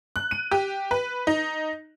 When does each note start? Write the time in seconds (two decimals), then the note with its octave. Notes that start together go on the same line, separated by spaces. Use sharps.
0.16 F#6
0.31 D#7
0.51 G4
0.91 B4
1.27 D#4